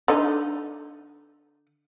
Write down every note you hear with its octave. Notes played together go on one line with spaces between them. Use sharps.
D3 D#4